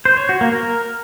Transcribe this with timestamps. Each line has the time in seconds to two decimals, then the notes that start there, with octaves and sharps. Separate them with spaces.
0.05 C5
0.17 C#5
0.29 F#4
0.41 A#3
0.53 A#4